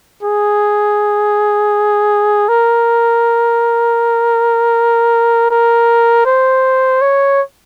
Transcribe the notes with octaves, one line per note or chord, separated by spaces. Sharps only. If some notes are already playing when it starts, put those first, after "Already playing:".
G#4
A#4
A#4
C5
C#5